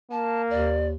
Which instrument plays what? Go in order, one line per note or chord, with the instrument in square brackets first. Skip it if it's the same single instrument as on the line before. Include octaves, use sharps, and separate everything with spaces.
[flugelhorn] A#3 [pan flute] A5
[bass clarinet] D#2 [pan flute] D5